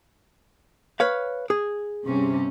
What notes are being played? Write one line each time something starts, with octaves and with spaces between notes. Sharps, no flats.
B4 C#5 F5
G#4
G2 C3 C#4